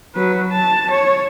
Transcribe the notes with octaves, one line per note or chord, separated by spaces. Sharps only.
F#3 B4
A5
C#5